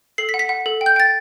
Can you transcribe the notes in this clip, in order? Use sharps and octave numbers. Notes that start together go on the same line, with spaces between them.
A4 C7
B6
F#5
B6
F#5
A4
G5
G6
G5 A6